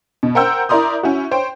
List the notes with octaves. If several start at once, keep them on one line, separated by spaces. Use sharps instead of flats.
B2
A#4 C5 F#5 G5 E6 G6
E4 A#4 D5 A#5 C6 D#6
C#4 E4 F#4
C5 C#5 G5